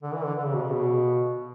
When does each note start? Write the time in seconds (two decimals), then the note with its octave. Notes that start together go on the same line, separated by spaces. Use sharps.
0.03 D3
0.13 E3
0.24 D3
0.38 D3
0.45 C#3
0.54 B2
0.62 C#3
0.73 B2